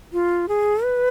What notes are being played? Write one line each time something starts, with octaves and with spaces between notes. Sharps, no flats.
F4
G#4
B4